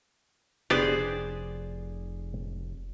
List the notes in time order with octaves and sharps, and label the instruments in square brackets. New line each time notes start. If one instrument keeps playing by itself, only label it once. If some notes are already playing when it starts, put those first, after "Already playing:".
[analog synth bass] F1 [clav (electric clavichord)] B3 D4 G4 [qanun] G#4 C5 D5